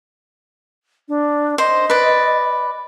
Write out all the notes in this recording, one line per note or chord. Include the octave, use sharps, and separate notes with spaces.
D4
C5 D#5
B4 D5